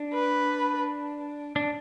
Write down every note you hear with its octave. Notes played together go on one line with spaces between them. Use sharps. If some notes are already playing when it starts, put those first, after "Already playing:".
Already playing: D4
B4
D4